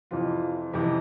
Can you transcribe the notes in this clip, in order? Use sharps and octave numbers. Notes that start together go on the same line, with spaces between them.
F2 C3 E3 F4
F2 C3 E3